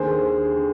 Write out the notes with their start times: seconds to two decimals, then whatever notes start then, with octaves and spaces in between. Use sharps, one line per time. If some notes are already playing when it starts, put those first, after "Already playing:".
Already playing: D#2 D3 G#4 C5
0.55 D3